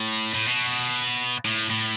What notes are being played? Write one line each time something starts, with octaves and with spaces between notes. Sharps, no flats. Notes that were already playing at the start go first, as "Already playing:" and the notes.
Already playing: A2
A2
B2
A2
A2